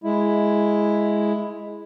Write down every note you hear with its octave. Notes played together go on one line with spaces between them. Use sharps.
G#3 E4